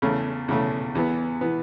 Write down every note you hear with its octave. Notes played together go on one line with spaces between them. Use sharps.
E2 C#3 A3
E2 C#3 A3
E2 E3 B3
E3 B3